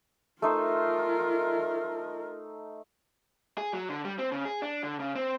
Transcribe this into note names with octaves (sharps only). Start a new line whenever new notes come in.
A3 D#4 F4 A#4 C5
G#4
F#3
D3
G3
C4
C#3
G#4
D4
D3
C#3
C4